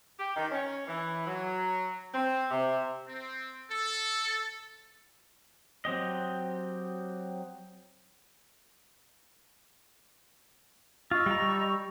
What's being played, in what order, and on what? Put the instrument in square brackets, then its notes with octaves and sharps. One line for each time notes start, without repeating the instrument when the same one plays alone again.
[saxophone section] G4
D#3
C#4
E3
F#3
C4
C3
[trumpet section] C4
A4
[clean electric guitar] F#3 C4 G4 D#5
[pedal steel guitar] F4 [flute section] D#5 C#6 E6
[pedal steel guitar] G3 A#5